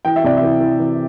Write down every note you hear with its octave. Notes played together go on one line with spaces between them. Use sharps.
E3 G5
E5
C3 D5
E5
E3
E3
E3